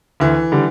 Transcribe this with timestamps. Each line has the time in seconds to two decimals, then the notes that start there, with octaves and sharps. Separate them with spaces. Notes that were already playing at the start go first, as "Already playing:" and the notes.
0.20 D2 E3
0.52 D3 G3